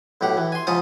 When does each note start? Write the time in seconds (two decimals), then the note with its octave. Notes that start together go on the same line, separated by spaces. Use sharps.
0.21 B1 A2 G4 F#5
0.37 E3
0.52 G#5 C6
0.67 G#2 C#3 F3 C#5 A5 D#6